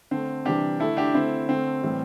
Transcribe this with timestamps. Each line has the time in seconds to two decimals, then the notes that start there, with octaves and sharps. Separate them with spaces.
0.11 D3 A3 C4
0.45 C3 E3 G3 D4 G4
0.80 D3 A3 E4 A4
0.97 D4 G4
1.14 D3 A3 C4 E4
1.49 D3 A3 C4
1.83 A2 E3 G3